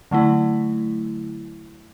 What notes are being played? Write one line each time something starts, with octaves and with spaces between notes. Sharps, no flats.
D3 F#3 A3 E4